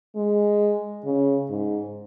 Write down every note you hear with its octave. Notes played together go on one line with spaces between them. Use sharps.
G#3
C#3
G#2